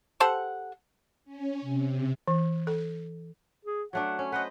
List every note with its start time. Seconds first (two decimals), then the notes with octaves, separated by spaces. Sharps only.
0.20 G4 A4 C5 F#5
1.25 C#4
1.61 C3
2.28 E3
2.67 A4
3.65 G#4
3.93 F#3 A3 D4 F#5
4.19 C#4
4.32 B4 C5 D#5 F#5